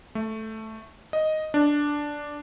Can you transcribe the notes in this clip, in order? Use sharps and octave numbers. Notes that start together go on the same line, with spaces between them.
A3
D#5
D4